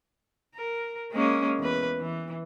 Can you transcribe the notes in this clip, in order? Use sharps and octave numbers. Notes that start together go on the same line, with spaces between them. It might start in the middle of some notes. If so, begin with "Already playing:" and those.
A#4
G#3 A#3 C#4
E2 B4
E3